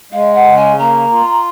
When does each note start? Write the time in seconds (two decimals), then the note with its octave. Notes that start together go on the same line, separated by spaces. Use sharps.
0.12 G#3 F5
0.34 F#5
0.45 C#3
0.57 G#5
0.78 A#3 A#5
1.12 F4